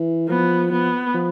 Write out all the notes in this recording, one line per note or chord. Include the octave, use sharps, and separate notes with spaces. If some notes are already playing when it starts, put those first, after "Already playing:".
Already playing: E3
F3 B3
F3 B3
F3